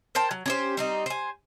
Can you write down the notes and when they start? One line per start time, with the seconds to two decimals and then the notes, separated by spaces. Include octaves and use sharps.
0.15 A#4 C5 G5 A5
0.31 F#3
0.46 C#4 G4 C5
0.77 G3 C4 D#4
1.06 C5 G#5